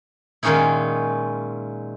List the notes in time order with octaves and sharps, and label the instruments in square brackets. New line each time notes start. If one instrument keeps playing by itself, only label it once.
[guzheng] A#2 D#3 G#3 C#4 D#4 E4